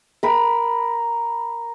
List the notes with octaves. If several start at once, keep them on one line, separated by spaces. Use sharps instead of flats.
A#4 B5